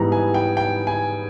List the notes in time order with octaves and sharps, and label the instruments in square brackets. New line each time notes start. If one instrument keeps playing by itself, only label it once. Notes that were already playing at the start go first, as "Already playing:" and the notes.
Already playing: [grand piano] G#2 E3 G3 B3 A#5
G#5
G5
G5
G#5